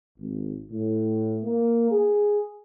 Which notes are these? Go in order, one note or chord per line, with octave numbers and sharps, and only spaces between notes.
G#1
A2
A#3
G#4